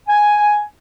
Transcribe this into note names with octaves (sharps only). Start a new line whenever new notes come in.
G#5